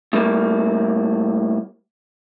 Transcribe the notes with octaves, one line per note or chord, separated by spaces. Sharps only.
A2 G3 A#3